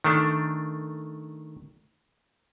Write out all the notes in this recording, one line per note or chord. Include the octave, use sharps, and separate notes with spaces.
D#3 A3 D4